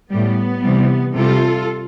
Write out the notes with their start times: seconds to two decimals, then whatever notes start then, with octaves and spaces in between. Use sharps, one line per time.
0.10 A2 G3 B3
0.63 C3 E3 G3
1.14 C3 G3 F4 A4